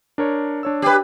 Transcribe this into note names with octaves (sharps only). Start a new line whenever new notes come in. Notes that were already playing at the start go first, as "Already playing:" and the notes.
D4 A#4 C#5
D4 C#5 E6
G4 B4